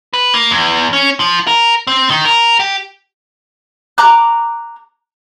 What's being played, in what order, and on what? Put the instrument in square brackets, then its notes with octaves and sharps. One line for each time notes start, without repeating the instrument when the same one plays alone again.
[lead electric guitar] B4
A#3
E2
C#4
F3
A#4
C4
D#3
A#4
G4
[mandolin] A#5 D6 F#6